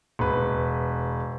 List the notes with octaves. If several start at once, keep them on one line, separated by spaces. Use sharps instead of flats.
E1 B4